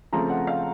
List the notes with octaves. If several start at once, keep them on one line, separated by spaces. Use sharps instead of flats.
C#3 F3 A3 C4 A#5
F#5
F5